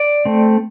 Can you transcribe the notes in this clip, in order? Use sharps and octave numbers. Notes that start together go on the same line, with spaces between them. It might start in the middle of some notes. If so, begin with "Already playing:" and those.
Already playing: D5
A3 C4